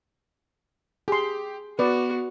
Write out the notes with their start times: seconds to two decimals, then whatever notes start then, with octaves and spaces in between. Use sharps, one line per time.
1.08 G4 G#4 C6
1.79 B3 F#4 B4 D5